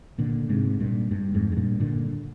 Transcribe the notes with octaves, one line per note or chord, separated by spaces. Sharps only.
A#2 D3
G#2 C3
G2 A#2
G2
F2 G#2
G#2
G2 A#2
A#2 D3